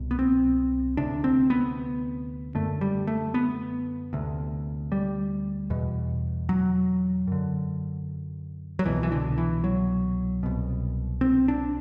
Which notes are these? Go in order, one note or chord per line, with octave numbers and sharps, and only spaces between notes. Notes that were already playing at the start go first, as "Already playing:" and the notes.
Already playing: C2 B2
B3
C4
D2 C3 D4
C4
B3
F#2 D3 A3
G3
A3
B3
D2 C3
G3
E2 B2
F#3
F#2 D3
F#3
C2 B2 E3
E3
D3
E3
F#3
C2 B2
C4
D4